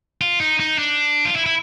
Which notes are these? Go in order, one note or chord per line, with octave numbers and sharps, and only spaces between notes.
F4
D#4
D#4
D4
F4
E4
E4